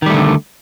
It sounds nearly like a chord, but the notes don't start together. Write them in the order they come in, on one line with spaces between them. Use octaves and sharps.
D#3 G3 A3 D3